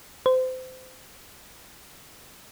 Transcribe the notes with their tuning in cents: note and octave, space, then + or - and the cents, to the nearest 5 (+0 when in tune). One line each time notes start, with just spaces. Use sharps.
C5 -30